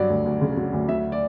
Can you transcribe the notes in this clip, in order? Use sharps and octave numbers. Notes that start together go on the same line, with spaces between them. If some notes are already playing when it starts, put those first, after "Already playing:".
Already playing: G2 F#3 D5
D2
D2
C#3
F#3
D2
F#3 E5
D5